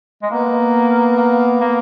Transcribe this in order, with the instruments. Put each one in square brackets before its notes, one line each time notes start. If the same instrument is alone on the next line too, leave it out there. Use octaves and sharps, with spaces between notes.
[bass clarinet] G#3
[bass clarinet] A#3 [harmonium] B3
[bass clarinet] A#3
A#3